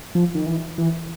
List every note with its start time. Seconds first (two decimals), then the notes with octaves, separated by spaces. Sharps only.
0.15 F3
0.35 D#3
0.46 E3
0.78 E3